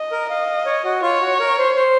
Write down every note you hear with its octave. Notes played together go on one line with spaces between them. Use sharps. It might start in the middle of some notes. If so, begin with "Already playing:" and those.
Already playing: D#5
A#4
D#5 F5
C#5
F#4
F4 C#5
F#4
A#4
C5
C5